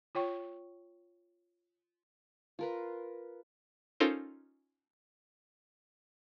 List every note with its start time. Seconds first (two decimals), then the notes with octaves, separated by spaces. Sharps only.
0.15 F4 C#5 G5 C#6
2.59 F4 A#4 B4
4.00 C#4 D#4 F4 A4 A#4 C5